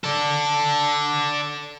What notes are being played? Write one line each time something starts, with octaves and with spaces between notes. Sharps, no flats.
A4 D5